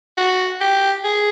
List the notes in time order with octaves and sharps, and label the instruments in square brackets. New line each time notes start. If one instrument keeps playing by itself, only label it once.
[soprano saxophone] F#4
G4
G#4